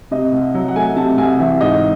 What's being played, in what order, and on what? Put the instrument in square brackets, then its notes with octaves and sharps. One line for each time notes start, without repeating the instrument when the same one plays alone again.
[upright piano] C3 D#5
C2
F#3
F#5
A3 G#5
C3 A5
C2 G#5
E3 E5
G#2 D#5